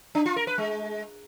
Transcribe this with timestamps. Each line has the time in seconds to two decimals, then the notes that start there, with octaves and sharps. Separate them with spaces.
0.15 D4
0.26 F4
0.36 A#4
0.47 B4
0.58 G#3